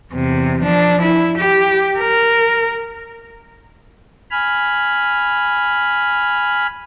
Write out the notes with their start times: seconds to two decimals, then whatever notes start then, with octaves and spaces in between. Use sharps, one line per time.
0.13 E2 C3
0.63 F3 D4
1.02 E4
1.38 G4
1.99 A#4
4.31 G#5 B5 F6